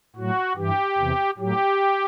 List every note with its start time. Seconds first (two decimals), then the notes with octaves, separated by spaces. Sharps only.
0.16 A2 F#3 F#4
0.57 G2 E3 G4
0.98 E2 C3 E3
1.38 A2 F#3 G4